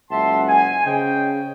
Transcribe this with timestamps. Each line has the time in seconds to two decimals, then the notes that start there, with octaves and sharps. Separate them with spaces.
0.11 F#1 C#2 E5 F#5 A5 C6
0.48 G#5
0.86 C#3 C5 D#5 G5